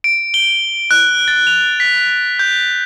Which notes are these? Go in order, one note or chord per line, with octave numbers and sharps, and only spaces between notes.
D7
G7
F#6
A6
F7
B6
G6